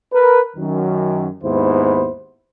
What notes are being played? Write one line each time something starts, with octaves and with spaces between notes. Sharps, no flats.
A#4 B4
F#2 D#3
D#2 G#2 B3 E4 C5